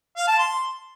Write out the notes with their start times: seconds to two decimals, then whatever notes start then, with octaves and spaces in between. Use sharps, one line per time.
0.17 F5
0.28 A5
0.39 C6